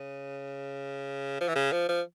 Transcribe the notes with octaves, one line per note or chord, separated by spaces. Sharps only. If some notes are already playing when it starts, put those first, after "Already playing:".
Already playing: C#3
F3
E3
C#3
F3
F3